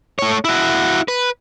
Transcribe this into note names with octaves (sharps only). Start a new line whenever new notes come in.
A3 C#5
E4 F#4
B4